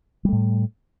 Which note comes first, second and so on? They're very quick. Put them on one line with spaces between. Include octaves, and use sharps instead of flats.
G3 A3 A2